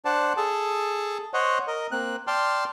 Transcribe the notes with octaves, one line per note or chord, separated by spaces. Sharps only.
D4 C5 D5 F#5 A5
G#4 A4 A5
C5 C#5 D#5 F#5
A#4 D#5
A#3 C4 F#6
D5 G5 A5 C6 F6